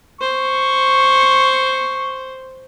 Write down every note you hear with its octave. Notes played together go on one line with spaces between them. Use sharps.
C5 C#6